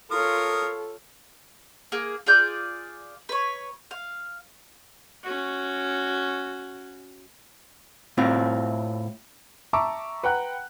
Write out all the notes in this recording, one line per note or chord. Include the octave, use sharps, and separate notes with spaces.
F4 A4 A#4 C#5 D#6
A#3 G#4
F4 G#4 D5 G6
B4 C#5
F5
C#4 F#4
A2 C4 F4
E5 A5 A#5 C#6 D6 E6
B4 F#5 G5 A#5 F#6